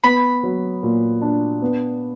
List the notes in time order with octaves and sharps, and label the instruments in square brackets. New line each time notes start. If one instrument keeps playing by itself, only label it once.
[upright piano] B3 [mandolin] B5
[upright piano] F#3
A#2
D4
B3